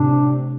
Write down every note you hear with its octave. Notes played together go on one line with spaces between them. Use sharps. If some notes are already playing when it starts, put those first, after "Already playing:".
Already playing: A2 C3 D4